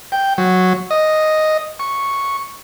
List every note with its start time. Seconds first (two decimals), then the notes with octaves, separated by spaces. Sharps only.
0.12 G5
0.38 F#3
0.91 D#5
1.79 C#6